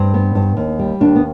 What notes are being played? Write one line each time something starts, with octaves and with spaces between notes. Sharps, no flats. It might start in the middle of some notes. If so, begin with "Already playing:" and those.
Already playing: G2 C4
B3
G2
D#2
G3
D#2 D4
B3